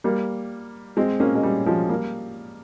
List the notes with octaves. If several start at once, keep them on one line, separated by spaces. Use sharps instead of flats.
G3 A#3
G#3 C4
A#3 C#4
G#3
G3
F3 G#3
G3 A#3